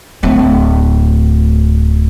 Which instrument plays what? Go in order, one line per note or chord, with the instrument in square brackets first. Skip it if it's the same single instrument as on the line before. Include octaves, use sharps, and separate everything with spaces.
[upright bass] D1 A2